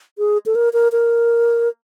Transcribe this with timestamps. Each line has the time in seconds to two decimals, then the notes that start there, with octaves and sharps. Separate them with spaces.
0.19 G#4
0.46 A4
0.55 A#4
0.73 A#4
0.92 A#4